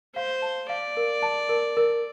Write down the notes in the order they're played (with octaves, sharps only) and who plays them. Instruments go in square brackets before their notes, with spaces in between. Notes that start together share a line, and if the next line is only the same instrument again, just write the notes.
[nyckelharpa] C5 [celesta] F5
[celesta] A5
[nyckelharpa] D5 [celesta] F5
[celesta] A#4
A5
A#4
A#4